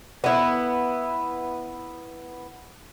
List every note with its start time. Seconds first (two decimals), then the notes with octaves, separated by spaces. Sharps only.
0.24 B3 E4